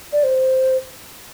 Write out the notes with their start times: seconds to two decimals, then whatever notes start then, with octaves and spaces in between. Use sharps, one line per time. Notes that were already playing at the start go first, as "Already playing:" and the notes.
0.13 D5
0.24 C5